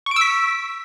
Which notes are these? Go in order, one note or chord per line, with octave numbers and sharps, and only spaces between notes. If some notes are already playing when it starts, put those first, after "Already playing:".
C#6 E6 B6 D7